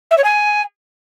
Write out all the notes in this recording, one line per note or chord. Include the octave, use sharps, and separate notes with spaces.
E5
C#5
G#5